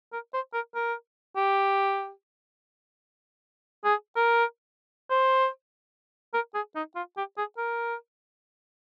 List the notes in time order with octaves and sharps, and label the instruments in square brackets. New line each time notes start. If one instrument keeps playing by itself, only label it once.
[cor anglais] A#4
C5
A#4
A#4
G4
G#4
A#4
C5
A#4
G#4
D#4
F4
G4
G#4
A#4